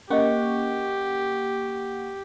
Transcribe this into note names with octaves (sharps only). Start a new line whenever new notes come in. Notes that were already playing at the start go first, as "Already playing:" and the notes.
A#3 C#4 G4 D#5 F#5 C#6